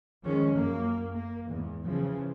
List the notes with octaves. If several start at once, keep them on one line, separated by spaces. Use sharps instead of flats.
D#3 F3 G#3 C#4
F#2 A#3
A#3
E2 G#2
C#3 E3 F3